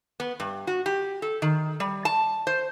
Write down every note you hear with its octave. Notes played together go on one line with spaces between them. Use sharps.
B3
G2
F#4
G4
A4
D#3
G3
A5
C5